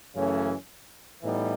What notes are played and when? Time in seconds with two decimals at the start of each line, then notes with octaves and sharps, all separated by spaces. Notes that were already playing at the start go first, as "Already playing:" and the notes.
0.15 F#2 C#3 E3 A3 C#4
1.21 A2 E3 G3 B3 D#4